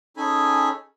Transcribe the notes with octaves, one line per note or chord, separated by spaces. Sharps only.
C#4 D#4 G#4 A4 G#5 B5